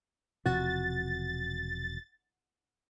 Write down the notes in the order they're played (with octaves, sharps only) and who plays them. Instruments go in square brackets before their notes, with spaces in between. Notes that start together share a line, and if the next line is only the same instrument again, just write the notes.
[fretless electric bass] E1 C3 F3 [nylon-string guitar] F#4 [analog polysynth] A6